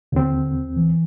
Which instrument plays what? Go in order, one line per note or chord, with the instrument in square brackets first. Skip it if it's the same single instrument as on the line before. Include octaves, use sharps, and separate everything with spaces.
[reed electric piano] D#2 C4 [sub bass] D3
[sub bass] E3